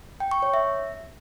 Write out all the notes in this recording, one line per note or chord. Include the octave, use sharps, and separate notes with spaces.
G5
C#6
C#5
E5